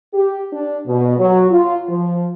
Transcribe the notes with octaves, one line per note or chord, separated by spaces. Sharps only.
G4
D4
B2
F#3
F4
F3